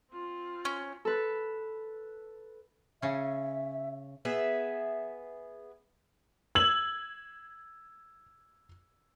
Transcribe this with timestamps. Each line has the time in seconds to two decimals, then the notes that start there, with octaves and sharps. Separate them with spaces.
0.12 C4 F4
0.65 C#4
1.05 A4 B4
3.02 C#3 C#4 E5
4.25 B3 G#4 E5
6.55 E6 G#6 F#7